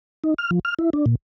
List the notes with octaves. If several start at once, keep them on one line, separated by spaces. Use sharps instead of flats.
D#4
F6
F3
F6
E4
D4
A#2